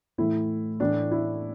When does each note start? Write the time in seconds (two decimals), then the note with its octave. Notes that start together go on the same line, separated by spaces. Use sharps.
0.18 A2 E3 A3 E4
0.80 A2 E3 A3 D4
1.11 E4